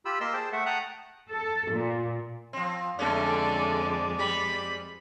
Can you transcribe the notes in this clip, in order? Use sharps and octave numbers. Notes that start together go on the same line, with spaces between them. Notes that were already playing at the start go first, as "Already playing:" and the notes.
F4 G4 B5 E6
A#3 A#4 D#5 C6 E6
G#4 C5 G5 A5
A3 E5 F#5
F#5 G5 A5 A#5 D#6 F#6
A4
A#2
F3 C4
F2 D3 G#3 A3 C#4 A4 D5
G3 G4 B5